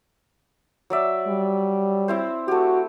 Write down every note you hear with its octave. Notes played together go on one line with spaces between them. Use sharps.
F#3 D5 E5
G3
C4 E4 C5
A3 F#4 G4